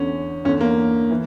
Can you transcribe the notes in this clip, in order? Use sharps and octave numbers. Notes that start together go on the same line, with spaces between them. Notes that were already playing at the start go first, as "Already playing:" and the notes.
Already playing: E2 D3 C#4
E2 D3 C#4
A#3
E3